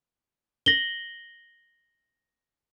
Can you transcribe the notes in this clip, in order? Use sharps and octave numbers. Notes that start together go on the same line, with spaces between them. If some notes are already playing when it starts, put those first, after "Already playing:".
A#6 F#7 G7